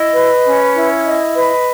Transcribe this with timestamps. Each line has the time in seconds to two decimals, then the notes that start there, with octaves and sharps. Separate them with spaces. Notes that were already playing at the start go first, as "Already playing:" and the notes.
Already playing: E4 D#5
0.13 B4
0.45 C#4
0.75 E4
1.05 D#5
1.35 B4